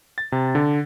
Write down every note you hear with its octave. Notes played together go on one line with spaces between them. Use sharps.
A6
C3
D3